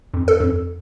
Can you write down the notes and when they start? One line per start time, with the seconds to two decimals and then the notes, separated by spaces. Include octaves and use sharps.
0.14 F2
0.28 A4
0.40 F2